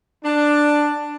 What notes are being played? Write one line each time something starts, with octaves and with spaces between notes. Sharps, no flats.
D4